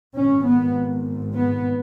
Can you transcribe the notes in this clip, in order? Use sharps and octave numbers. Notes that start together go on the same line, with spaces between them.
G#1 G#2 C#4
B3
B3